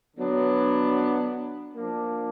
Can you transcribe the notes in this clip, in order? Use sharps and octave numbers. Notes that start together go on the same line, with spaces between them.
D3 F#3 B3 D4
F3 A#3 D4